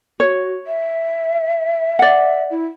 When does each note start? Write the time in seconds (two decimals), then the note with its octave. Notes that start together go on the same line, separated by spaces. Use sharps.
0.20 F#4 C#5
0.67 E5
1.99 D5 F#5
2.51 E4